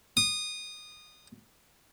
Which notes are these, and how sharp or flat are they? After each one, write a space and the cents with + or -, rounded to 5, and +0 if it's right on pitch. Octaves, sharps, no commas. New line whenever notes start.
D#6 -20